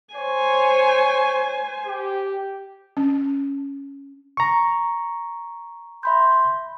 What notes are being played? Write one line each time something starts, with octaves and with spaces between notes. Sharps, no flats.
C5 C#5 G#5
G4
C#4
A#5 C#6
E5 B5 C6 G6